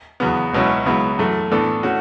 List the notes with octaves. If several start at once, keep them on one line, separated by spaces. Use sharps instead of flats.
E2 C#3 F#3 B3
C#2 B2 F#3 C#4 E4
C#2 C#3 F#3 B3 E4
F#2 E3 A3
A2 E3 B3 D4 A4
A3 C#4 F#4